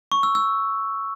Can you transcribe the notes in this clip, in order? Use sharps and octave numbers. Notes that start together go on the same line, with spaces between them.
C#6
E6
E6